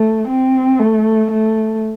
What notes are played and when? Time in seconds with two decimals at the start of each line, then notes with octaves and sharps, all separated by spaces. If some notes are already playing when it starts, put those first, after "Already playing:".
Already playing: A3
0.28 C4
0.80 A3
1.31 A3